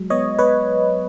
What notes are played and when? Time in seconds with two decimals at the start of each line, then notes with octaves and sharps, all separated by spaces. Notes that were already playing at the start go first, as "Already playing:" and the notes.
Already playing: F#3 G#3
0.10 B3 C#5 D#5
0.39 B3 B4 C#5